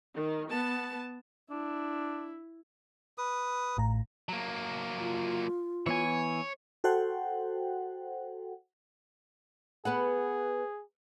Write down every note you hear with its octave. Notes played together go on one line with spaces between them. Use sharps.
D#3
B3 A5
D4 E4
B4 D#6
A1 A2 A#5
F#3 A#3
F4
E3 B3 C#5 G#5
F#4 A4 C5 F#5 G5
B3 G#4 B4 F#5